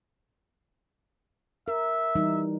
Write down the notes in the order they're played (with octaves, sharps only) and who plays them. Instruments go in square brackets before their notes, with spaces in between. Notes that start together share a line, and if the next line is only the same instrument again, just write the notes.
[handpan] A#4 [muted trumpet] E5
[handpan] E3 G3 D#4